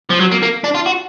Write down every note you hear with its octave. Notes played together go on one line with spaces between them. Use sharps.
F3
F#3
A#3
A#3
D4
F4
F#4